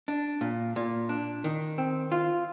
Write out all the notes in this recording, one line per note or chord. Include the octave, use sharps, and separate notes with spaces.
D4
A#2
A#2
D4
D#3
C4
F4